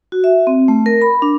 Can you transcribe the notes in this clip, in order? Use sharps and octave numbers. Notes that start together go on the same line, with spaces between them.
F#4
E5
C4
A3
A#4
B5
D4